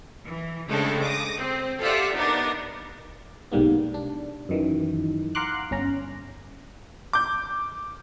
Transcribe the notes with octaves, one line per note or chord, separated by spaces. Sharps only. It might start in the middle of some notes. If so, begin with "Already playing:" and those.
E3
C#3 G#3 A3 C4 D4 A4
D6 D#6 A#6
C4
F4 G4 A4 D5 E5 F#5
B3 D4 D#4 A#4
B1 G#2 G3 A#3 B3
D4
F#2 D#3 E3
F5 F#5 A#5 C6 D6 F#6
G1 C#4 A#5
D6 G6